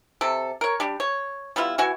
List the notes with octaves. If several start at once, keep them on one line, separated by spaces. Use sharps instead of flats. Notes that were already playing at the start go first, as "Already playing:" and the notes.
C3 A4
A#4 C#5
G3 D4 G4
C#5
G3 B3 E4 F4
E3 F#4 F#5 G#5